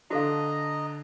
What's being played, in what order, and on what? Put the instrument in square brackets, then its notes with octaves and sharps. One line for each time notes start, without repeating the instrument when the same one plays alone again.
[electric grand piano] D3 D4 [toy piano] F#4 A4 F5 [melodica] D#5 A#5